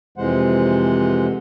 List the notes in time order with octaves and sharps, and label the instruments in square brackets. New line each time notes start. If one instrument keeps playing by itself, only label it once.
[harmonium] F2 C3 E3 G#3 C5 F#5